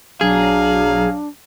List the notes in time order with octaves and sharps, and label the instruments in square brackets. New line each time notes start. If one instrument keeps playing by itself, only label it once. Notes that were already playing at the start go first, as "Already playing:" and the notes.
[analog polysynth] B1 F#3 A#5 [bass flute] D4 [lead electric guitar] G#4 [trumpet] F5